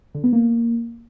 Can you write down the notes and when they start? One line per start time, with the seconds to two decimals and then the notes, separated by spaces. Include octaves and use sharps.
0.15 D3
0.24 B3
0.33 A#3